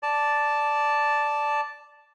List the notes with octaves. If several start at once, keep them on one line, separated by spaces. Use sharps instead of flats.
D5 A5